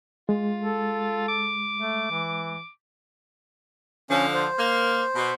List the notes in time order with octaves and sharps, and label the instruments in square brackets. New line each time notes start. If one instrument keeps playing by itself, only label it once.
[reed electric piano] G#3 [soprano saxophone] F4
[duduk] A4
[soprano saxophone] D6
[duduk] A3
E3
[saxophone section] D3 F3 [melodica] C#4
[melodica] C5
[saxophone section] A#3
B2